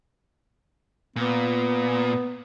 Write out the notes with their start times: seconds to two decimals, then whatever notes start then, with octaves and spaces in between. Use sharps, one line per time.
1.16 A#2 B3